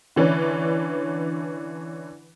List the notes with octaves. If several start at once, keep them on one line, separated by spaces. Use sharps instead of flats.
D3 E3 C#4 D4 B4